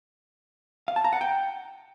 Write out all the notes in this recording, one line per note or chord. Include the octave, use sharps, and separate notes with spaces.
F5
A5
A#5
F#5
G5